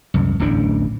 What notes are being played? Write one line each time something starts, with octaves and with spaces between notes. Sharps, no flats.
C2 F#2
D1 A1 E2 D4